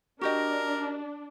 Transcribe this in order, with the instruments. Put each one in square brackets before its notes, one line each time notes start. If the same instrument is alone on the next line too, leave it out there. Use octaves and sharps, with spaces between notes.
[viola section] D4 [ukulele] F#4 G4 D#5 [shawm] A#4